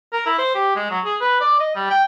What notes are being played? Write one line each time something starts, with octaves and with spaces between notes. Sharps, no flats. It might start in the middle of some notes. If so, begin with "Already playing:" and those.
A#4
E4
C5
G4
G#3
F#3
G#4
B4
D5
D#5
G3
G5